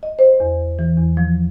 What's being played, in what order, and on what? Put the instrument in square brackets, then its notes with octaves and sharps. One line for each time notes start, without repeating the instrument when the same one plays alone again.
[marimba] D#5
C5
E2
E3
E2
F3